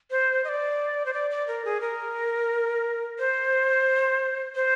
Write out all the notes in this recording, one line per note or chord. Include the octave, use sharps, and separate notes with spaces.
C5
D#5
D5
C5
D5
D5
A#4
G#4
A#4
C5
C5